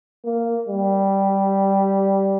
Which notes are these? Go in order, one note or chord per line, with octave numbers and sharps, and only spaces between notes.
A#3
G3